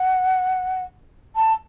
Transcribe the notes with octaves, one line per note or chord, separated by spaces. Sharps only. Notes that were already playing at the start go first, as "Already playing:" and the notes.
Already playing: F#5
A5